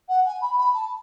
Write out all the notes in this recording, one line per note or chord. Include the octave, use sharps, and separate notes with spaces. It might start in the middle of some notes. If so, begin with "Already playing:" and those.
F#5
G#5
B5
B5
A5